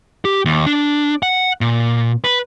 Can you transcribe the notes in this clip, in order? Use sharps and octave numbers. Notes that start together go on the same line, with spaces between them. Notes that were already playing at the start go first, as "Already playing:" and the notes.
G4
D#2
D4
F#5
A#2
B4